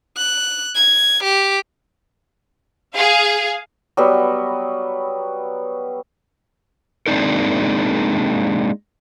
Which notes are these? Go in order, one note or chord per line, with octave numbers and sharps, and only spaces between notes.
F#6
G#6
G4
G#4 F5
F#3 G3 B3 B4
G#3 A#3 C4 D4 D#4 A#4